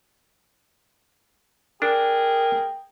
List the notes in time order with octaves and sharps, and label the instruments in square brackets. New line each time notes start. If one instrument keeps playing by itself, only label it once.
[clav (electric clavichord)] D4 [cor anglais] G#4 [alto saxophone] A#4 [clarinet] G5